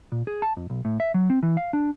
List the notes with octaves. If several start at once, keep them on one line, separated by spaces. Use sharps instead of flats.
A#2
G#4
A5
F2
B1
A2
E5
F#3
C4
E3
F5
D4